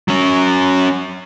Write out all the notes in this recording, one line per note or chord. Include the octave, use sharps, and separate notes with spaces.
F#3 C#4